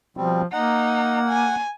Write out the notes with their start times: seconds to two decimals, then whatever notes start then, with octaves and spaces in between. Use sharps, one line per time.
0.17 B2 F3 G3 C4
0.52 A#3 D#4 F#5
1.29 G#5